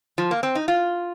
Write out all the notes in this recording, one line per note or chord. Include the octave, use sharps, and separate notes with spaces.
F3
A#3
C4
D#4
F4